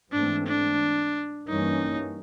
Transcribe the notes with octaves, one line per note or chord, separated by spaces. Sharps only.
G#2 E3 A3 C4 D4
D4
G2 E3 G3 A#3 C#4 D#4